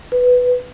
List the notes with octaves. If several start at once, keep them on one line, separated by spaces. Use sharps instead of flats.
B4